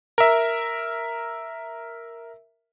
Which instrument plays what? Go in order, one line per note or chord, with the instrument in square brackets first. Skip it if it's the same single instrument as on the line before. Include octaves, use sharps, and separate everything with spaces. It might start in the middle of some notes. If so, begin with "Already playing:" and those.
[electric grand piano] A#4 E5